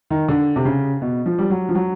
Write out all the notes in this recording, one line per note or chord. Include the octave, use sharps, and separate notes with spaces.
D#3
D3
C3
C#3
B2
F3
G3
F#3
F3
F#3